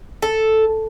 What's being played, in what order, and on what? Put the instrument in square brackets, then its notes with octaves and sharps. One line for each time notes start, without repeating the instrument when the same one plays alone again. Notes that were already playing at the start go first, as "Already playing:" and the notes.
[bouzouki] A4